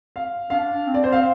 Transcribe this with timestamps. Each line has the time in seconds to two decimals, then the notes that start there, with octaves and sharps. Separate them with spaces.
0.16 F5
0.50 D4 F5
0.87 C4
0.94 D5
1.04 C5
1.12 F5